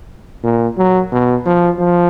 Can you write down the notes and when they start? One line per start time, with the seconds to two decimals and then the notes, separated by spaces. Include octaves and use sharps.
0.44 A#2
0.78 F#3
1.12 B2
1.46 F3
1.80 F3